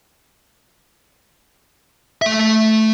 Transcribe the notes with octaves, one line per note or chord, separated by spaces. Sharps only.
A3 E5